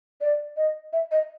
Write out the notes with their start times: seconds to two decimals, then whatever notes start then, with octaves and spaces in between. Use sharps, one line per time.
0.21 D5
0.57 D#5
0.93 E5
1.12 D#5